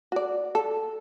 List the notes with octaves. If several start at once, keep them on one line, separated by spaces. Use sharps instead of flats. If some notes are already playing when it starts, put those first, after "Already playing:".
F#4 D5
A4